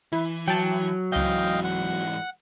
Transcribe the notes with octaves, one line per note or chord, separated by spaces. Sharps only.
E3 E4
F#3 G5 A5
C#2 G#2 E3 D#5 F5 G5 G6
F#5